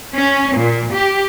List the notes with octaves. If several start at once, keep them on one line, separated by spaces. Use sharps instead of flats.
C#4
A#2
G4